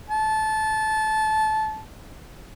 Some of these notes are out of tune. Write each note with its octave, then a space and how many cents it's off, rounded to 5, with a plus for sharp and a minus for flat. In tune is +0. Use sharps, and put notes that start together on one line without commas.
A5 -20